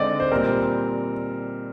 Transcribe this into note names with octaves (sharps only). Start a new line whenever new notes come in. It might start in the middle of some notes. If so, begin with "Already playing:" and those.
Already playing: D3 G#3 C4 D#4 D5 D#5
C5
A#2 G3 C4 A#4